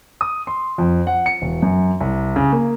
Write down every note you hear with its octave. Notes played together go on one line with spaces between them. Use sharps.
D#6
C6
F2
F#5
C#7
E1
F#2
C2
C#3
A#3